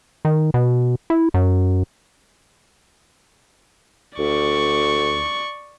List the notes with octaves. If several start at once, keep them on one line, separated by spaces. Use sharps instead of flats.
D#3
B2
E4
F#2
D2 D5 C#6